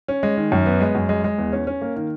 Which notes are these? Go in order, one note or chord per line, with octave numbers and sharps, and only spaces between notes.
C#4
G#3
D#3
F#2
B3
G#3
F#2
G#3
G#3
E2
C#4
C#4
A#3
D#3